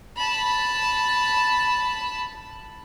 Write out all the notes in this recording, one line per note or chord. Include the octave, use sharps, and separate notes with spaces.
A5 B5